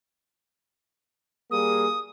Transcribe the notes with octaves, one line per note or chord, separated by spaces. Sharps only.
G3 A#3 G#4 D#6